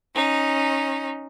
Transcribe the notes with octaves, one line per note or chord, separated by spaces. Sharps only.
C#4 D#4